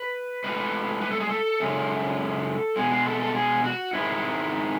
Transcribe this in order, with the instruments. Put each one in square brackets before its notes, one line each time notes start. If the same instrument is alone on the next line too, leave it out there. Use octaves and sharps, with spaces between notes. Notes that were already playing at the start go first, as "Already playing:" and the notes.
Already playing: [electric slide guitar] B4
A2 G#3 B4
B4
A4
G#4
A4
F#2 C#3 G#3
B2 G#3 G#4
G#4
A4
A4
G#4
F#4
G#2 D#3 G#3 E4